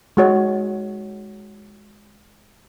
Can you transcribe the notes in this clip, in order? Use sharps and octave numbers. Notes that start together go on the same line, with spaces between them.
G#3 F#4 C#5